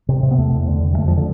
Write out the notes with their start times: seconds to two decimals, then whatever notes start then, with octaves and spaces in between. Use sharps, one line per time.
0.09 C3
0.23 C3
0.31 B3
0.38 E2 A3
0.53 E2
0.68 D3
0.83 D3
0.93 G3
0.98 F2 A3
1.08 F3
1.17 D3